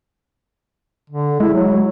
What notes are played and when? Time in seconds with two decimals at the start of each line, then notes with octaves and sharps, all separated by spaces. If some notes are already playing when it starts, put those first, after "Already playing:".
1.10 D3
1.40 G#3 E4
1.54 F#3